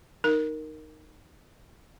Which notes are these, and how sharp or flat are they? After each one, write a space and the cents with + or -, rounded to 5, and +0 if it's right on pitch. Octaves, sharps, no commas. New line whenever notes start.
D#4 -5 A#4 -5